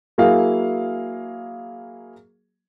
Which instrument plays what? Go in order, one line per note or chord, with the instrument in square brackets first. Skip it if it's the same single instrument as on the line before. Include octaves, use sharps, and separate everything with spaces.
[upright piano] F#3 A#3 E4 G#4 F5